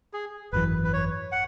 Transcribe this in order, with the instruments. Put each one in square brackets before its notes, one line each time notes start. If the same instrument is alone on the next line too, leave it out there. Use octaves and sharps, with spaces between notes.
[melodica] G#4
[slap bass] G#1 F#2 E3 [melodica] B4
[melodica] B4
C#5
F#5